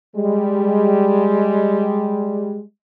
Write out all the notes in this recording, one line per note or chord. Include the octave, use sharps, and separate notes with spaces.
G3 G#3